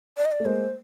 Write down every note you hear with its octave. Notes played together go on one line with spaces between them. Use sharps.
D5
D#5
D5
A3
G#3 A#3 C5